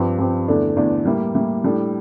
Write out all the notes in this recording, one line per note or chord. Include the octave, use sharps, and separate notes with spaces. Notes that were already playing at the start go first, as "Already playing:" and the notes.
Already playing: G2 F3 C4 G4
G2 F3 C4 G4
E2 D3 A3 D4
E2 D3 A3 D4
A2 G3 A#3 E4
A2 G3 A#3 E4
A2 G3 D4 A4